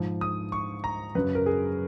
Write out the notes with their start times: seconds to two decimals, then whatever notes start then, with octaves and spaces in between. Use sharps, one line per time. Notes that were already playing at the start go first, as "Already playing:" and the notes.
Already playing: G#2 F3
0.21 D#6
0.52 C#6
0.84 A#5
1.15 F#2 C#3 F#3 B4
1.35 A#4
1.46 G#4